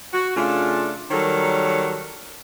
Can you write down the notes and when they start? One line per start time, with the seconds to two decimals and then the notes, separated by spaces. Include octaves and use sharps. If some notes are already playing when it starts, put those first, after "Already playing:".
0.13 F#4
0.36 C#3 A3 D4 F4
1.10 D#3 F#3 G3 A4 A#4 C#5